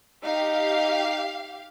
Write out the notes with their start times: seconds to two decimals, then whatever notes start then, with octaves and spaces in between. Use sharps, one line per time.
0.24 D#4 G4 F5